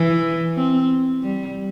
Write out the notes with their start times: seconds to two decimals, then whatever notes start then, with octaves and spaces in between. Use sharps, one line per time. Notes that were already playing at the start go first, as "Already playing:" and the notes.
Already playing: E3
0.56 C4
1.23 G3